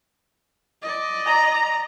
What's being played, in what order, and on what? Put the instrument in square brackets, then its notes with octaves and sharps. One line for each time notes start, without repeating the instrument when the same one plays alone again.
[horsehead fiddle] D5 D#5
[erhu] A#5